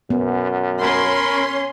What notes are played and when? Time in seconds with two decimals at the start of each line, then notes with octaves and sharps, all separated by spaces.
0.10 F#2 B3
0.81 C#4 A#4 B5 C6